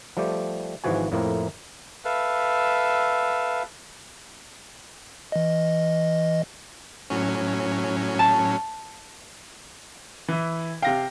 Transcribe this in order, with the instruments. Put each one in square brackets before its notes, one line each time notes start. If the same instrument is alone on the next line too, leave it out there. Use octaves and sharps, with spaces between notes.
[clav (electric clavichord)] F3 G3 A3 G4
G#1 G#2 E3 F3 F#4 G#5
F2 A2 A#3 C4 E4 A#4
[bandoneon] A4 B4 E5 F5
[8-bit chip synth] E3 D#5
A2 F#3 C#4
[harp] A5
[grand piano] E3 E4
[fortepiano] C3 F5 [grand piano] G5 A#6